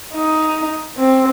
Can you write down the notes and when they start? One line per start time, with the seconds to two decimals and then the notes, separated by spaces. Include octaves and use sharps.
0.14 D#4
0.97 C4